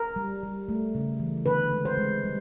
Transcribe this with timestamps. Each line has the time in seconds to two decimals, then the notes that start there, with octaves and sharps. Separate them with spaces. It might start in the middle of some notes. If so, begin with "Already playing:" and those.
Already playing: A#4
0.16 G3
0.43 G3
0.68 A3
0.95 C#3
1.20 E3
1.46 D3 B4
1.72 G#3
1.85 C5
1.98 G#3
2.24 G3